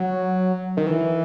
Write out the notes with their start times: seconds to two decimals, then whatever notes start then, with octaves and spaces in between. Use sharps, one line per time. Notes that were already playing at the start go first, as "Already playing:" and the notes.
Already playing: F#3
0.77 D#3
0.87 E3